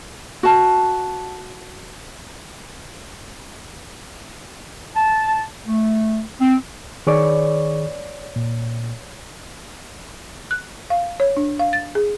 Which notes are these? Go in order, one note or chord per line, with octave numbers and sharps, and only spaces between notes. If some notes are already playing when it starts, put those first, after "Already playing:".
F#4 A5
A5
A3
C4
D#3 G#4 B4 C#5 D5 C#6
A#2
F#6
F5
C#5
D4
F5
A6
G#4